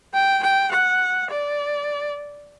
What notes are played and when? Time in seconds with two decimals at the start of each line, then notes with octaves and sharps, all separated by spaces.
0.14 G5
0.43 G5
0.72 F#5
1.30 D5